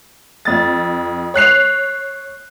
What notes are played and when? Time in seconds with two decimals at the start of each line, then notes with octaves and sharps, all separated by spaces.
0.45 F2 A6
1.34 C#5 F#6 C7 F7